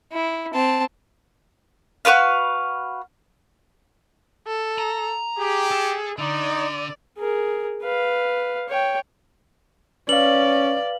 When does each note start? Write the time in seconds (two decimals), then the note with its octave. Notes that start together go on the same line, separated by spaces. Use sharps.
0.12 E4
0.54 C4 A5
2.05 F#4 A#4 B4 F5
4.47 A4
4.78 A#5
5.39 G4 G#4
5.71 A4
6.18 D3 D#4 D5
7.18 G#4 A#4
7.84 B4 F5
8.69 C#5 G5
10.09 C#4 B4 D5 F5 F#7